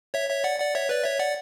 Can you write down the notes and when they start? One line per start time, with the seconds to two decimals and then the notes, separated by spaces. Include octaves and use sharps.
0.14 C#5 E5
0.29 C#5 E5
0.44 D5 F#5
0.59 D5 F#5
0.75 C#5 E5
0.89 B4 D5
1.04 C#5 E5
1.19 D5 F#5